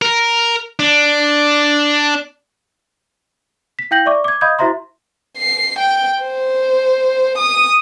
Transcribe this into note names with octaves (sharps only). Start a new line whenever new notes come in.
A#4
D4
B6
E4 F5 G5 G6 A#6 F#7
D5 E5 C#6 D6
D6 G#6
D#5 F5 B5 D#6 G6 G#6
E4 F#4 C5 E5 A#5 C6
C7
G5
C5
D#6